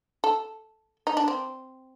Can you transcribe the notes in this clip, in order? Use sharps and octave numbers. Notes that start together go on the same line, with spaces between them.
A4
D#4
D4
C4